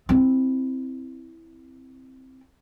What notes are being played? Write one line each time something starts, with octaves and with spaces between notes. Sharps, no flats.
C4 E4